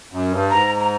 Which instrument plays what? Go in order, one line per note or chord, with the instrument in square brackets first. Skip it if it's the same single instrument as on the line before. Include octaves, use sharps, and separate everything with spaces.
[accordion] F#2
G2
[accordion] G#2 [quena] A#5
[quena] A#5